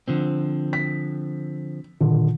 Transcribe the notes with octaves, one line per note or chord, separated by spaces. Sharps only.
D3 F3 C4
B6
A#2 D3 D#3 F4